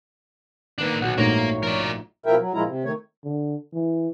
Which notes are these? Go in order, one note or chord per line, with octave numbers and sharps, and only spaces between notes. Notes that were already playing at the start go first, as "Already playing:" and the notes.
D#3 A#3 D4 B4
B1 A#2 F#4 F#5
A#1 G#2 A3 A#3 D#4 F4 A#4 C#5
F3 A#4 D5
B2 F3 E4 A#4 E5 G5
F#3
A#2 F3 G#3 E4 F4 A#5
C3
D#3 A3 C#5
D3
E3